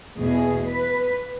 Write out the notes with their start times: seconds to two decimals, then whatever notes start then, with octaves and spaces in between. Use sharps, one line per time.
0.17 E2 B2 A3 G#4
0.66 B4